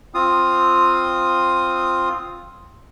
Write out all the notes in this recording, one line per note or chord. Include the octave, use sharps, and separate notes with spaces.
C4 F4 D#6